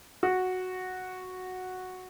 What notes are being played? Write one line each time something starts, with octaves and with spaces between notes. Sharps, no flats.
F#4